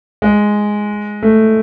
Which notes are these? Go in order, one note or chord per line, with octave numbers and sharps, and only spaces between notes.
G#3
A3